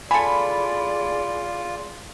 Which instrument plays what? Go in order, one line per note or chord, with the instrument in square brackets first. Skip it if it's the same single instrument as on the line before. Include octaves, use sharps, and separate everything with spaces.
[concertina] F4 [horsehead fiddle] G#4 D5 [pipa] A4 G#5 [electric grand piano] B5